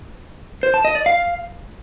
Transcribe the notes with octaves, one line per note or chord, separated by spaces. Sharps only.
C5
A5
D#5
D5
F5